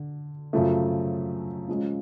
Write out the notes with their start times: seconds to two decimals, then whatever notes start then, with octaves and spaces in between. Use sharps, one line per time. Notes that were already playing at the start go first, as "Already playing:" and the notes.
Already playing: D3
0.53 F#2 C#3 F3 A3
1.68 F3 G#3 C#4